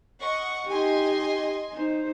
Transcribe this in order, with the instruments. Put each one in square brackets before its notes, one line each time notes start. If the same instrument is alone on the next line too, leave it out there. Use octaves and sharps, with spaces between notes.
[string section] D#5 F#5 C#6
[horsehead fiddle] D#4 G4 [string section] D#5 G#5 C6
[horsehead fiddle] D#4 C5